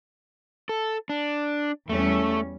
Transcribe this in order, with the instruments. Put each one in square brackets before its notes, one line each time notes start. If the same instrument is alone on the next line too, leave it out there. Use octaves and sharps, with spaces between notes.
[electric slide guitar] A4
D4
[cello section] E2 G3 C#4 [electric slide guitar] A3